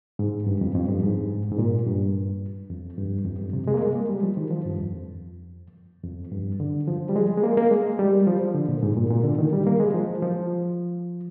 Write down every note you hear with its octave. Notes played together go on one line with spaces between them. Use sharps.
G#2
G2
F2
F2
G2
G#2
G#2
A#2
G2
F2
G2
F2
G2
C3
G#3
A#3
G#3
A#3
G3
F3
D#3
F3
G2
F2
F2
G2
D3
F3
G3
G#3
G#3
A#3
A#3
G#3
G3
F3
D3
A#2
G#2
A#2
A#2
D3
D#3
G3
A#3
G#3
F3
F3